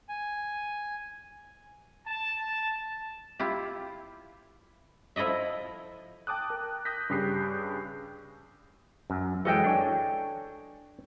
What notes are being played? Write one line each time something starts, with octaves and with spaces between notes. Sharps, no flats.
G#5
A5
E4 F4 G4
F3 E4 A4 D#5 E5
G5 A5 D6 D#6 F#6
A#4
D#6 F#6 G6 A#6 B6
G2 C#3 G4 D#6 C7
F#2
E3 F#3 G#3 A4 D#5 G5
D4 C#5 G#5